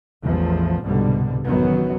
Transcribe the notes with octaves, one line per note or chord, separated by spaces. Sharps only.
A1 E2 F3
C2 G#2 B2 D3 G3
A1 F#2 D#3 F#3 B3